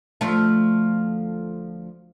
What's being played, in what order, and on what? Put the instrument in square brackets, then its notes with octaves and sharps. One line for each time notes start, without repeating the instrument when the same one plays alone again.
[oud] D2 F3 A3